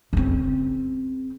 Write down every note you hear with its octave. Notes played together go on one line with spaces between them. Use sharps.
C#3 C4